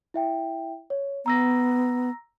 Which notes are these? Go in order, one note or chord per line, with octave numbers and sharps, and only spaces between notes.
E4 E5 G5
C#5
B3 A#5 E6 A#6